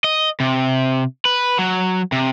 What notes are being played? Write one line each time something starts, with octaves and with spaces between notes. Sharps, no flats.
D#5
C3
B4
F#3
C3